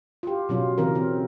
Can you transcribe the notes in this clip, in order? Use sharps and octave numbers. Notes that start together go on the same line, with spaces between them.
F4 G4
B2 F#3 C#4 F4
C#3 E3 C4 A#4
C4